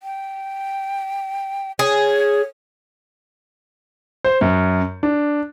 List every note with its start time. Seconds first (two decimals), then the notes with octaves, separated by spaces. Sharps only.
0.03 G5
1.79 G#4 C#5
4.24 C5
4.41 F#2
5.03 D4